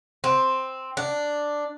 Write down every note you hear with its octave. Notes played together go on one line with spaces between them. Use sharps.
C4
D4